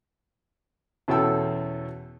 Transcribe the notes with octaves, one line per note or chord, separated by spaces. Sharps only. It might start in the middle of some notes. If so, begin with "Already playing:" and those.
E2 B2 C#4 A4 G5 E6